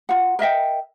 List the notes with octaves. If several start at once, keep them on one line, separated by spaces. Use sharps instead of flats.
F4 F#5
A#4 D#5 E5 G5